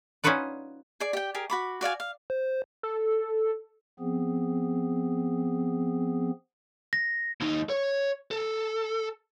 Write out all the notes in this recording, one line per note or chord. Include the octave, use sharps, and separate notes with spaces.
C#4 D#4 F4 F#4 B4 D5
G#4 D5
G4 G5
G4 G#4 A#4
F#4 B5 D6
F#4 D5 F5 G#5
F5
C5
A4
F3 B3 C4 G#4
A#6
D#2 D#4
C#5
A4